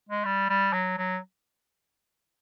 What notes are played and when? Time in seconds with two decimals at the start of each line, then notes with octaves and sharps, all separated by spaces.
0.09 G#3
0.25 G3
0.49 G3
0.73 F#3
0.98 F#3